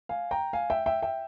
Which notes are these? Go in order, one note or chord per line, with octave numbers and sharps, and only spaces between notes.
F5 G#5
G5 A#5
F5 G#5
E5 G5
E5 G5
E5 G5